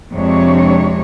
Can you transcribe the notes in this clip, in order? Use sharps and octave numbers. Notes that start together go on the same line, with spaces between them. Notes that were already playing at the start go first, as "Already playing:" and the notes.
F2 C3 G#3 D4 C#5